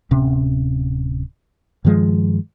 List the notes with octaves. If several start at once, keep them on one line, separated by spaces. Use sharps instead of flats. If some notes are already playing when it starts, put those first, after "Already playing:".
D1 C3 C#4
G2 D#3 F3 G#3